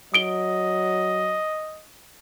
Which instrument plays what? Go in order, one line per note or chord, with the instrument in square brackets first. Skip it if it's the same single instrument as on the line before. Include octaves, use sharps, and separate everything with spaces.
[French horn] F#3 [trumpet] D#5 [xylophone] D#6 D7 G7